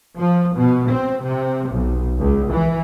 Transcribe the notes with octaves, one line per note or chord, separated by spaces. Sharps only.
F3
B2
C4
C3
B1
C#2
E3